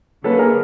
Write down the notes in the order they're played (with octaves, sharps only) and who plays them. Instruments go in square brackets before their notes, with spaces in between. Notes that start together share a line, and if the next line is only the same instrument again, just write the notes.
[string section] D3 F#3 A#3 C#4 [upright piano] A4 B4
[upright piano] G#4 A#4